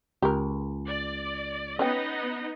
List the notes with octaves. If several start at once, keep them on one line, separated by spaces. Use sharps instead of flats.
C#2 G4 A#4
D5
B3 C#4 D#4 B4 D#5 G5